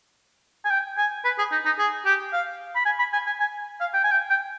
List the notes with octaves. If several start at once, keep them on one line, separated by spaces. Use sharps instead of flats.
G#5
G5
G#5
B4
G#4
D#4
D#4
G#4
G4
F5
B5
G#5
B5
G#5
G#5
G#5
F5
G5
G#5
G5
G5